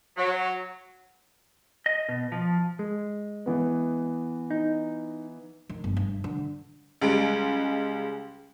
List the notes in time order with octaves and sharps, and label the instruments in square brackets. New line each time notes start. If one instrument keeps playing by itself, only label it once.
[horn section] F#3
[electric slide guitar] D#5
B2
F3
[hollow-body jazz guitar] G#3
[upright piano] E3 B3
[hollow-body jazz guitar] D#4
[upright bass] D#3
G1
G2
D3
[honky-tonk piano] C#2 G3 G#3 D7